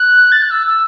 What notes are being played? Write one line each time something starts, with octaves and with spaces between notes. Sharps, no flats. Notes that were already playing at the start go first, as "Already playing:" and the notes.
Already playing: F#6
A6
F#6
E6
E6